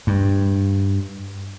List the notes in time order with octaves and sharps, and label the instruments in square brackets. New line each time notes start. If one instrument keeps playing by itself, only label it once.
[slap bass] G2